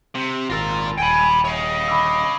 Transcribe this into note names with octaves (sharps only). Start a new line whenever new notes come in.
C3
G#1 F4 A#4 E6 A6 A#6
D#1 G5 G#5 B5 D7 D#7
C#5 D#5 F5
B5 D6 E6